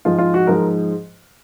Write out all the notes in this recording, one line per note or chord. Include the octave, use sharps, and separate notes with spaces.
G#2 F3 G#3 F4
F4
F#4
G#2 F3 G#3 A#4